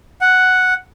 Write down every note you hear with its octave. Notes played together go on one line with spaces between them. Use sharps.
F#5